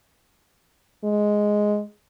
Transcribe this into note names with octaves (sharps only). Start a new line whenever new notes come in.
G#3